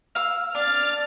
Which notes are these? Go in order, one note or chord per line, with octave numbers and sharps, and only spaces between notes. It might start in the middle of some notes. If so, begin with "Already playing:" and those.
F5 E6
D4 F6 A6